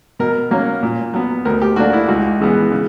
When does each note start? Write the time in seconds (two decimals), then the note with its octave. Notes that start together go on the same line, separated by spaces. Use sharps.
0.19 B2 A#4
0.51 F#3 A#3 C#4
0.83 A#2
1.14 F#3 B3
1.45 D2 A#4
1.62 G4
1.76 D3 A#3 D4 F#4
1.93 E4
2.08 C#2 F#4
2.40 C#3 E3 B3
2.72 C#3